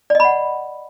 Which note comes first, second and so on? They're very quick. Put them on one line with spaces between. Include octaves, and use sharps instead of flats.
D5 D#5 B5 F#5